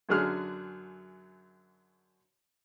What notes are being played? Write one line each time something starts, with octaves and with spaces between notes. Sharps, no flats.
F#2 D3 F#3 G#4 F6